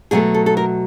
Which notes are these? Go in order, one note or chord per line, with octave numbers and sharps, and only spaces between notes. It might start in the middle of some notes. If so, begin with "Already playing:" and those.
B2 F#3 A3 G#4
A4
A4
A#4